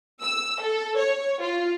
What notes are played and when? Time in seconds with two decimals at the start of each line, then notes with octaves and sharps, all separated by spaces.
0.22 E6
0.61 A4
0.98 C#5
1.42 F4